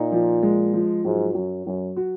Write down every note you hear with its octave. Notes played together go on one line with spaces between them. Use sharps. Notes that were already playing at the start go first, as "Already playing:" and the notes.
Already playing: A#2 D#4
F3
G#3
F3
G#2 F#3
F#2 F#3
F#2 F#3
F#4